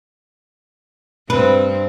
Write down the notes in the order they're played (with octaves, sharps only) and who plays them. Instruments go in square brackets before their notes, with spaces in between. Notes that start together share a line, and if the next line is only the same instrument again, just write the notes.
[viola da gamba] G2 C4 [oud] B4